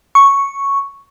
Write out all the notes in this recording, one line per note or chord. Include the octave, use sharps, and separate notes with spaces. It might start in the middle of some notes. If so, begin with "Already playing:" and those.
C#6